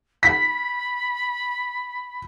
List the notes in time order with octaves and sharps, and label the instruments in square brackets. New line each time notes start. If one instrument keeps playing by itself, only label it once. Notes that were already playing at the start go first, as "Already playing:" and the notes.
[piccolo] B5 [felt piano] B6